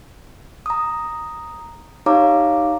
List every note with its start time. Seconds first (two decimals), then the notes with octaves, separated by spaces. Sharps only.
0.66 A#5 D#6
2.06 D#4 G4 C#5 F5 A#5 D6